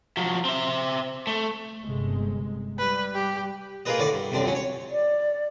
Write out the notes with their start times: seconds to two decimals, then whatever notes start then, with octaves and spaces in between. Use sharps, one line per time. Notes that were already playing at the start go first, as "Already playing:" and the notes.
0.17 F3 F#3
0.45 C4 E5
1.27 A3
1.83 G1 C3 G#3
2.78 G3 B4
3.14 G4
3.85 A#3 F4 G#4 A#4 B4 D#5
3.98 A2 D3 D5 C#6
4.13 G2
4.31 C2 F#2 A2 C4 D4
4.43 C#2 F#3 C#4
4.55 C#5
4.91 D5